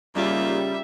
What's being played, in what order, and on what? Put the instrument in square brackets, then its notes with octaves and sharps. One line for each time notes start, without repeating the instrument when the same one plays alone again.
[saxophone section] D#2 F4 [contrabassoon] C#3 [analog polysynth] G3 [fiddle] E5